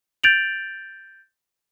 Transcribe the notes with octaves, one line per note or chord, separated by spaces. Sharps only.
G6 A6 D7 F7 F#7